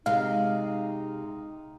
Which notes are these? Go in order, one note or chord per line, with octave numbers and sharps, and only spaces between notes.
C3 G#3 D#4 F5